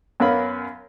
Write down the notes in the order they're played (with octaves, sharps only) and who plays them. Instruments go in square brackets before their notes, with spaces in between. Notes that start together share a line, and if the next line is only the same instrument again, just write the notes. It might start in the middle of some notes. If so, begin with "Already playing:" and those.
[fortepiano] F#2 B3 C#4 A#4 F5 B5